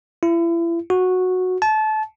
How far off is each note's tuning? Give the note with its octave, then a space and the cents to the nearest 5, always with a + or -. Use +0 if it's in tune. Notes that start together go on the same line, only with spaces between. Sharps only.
E4 +35
F#4 -10
A5 -25